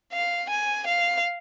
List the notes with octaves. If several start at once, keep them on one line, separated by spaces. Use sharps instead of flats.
F5
G#5
F5